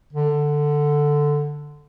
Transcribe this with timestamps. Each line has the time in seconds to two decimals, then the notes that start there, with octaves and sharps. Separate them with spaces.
0.13 D3